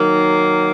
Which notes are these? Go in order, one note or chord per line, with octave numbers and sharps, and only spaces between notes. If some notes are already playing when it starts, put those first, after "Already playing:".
Already playing: D#3 F#3 A#3